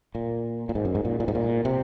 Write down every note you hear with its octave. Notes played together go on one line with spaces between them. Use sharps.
A#2
A#2
G#2
F#2
G#2
A#2
A#2
G#2
A#2
C3